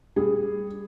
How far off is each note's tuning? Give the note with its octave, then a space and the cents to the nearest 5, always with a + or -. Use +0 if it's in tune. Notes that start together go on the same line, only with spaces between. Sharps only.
G3 +15 G#4 +0